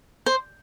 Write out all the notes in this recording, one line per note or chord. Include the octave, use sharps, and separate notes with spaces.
C5